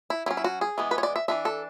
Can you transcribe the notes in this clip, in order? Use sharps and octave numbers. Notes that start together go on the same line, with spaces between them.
E4
F#3 C#4 E4
E4
F#4
G#4
E3 G#3 B3
B4
C#5
D5
E5
E3 A3 D4 E5
A4